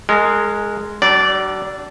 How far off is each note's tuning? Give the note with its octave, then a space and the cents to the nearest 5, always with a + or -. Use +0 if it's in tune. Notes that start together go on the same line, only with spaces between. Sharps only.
G#3 +0 A#4 -30
F#3 +45 D4 +0 D5 -10